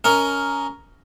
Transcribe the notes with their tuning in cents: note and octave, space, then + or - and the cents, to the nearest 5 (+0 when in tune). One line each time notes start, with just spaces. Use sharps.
C#4 +15 A#4 +0 D#5 +0